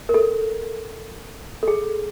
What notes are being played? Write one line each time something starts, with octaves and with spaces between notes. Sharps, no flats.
A#4
A4
A4
G#4